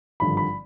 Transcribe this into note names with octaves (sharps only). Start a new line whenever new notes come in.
G#1 G2 D3 F3 B5
B5